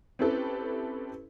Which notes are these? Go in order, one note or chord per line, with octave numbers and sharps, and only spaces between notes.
C4 C#4 E4 G4 A4 B4